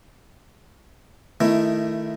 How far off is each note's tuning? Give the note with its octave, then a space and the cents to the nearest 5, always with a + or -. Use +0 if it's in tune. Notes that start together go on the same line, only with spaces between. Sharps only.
D#3 +0 A3 +0 E4 +20